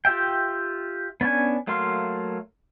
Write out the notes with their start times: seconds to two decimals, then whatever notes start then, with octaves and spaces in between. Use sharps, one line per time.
0.05 F4 G4 E5 G5
1.21 B3 C#4 D4 G#5
1.67 F#3 A3 A#3 F5 C6